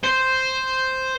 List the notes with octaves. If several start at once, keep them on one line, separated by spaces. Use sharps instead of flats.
C5